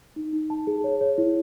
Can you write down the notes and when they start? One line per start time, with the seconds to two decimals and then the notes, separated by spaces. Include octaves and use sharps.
0.16 D#4
0.33 D#4
0.50 A5
0.67 G#4
0.84 C#5
1.01 C#5
1.18 E4